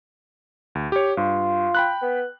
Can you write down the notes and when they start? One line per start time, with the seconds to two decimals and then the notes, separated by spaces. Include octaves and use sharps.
0.75 D2
0.92 G4 C#5
1.17 G2 F4
1.75 G5 B5 F#6
2.02 B3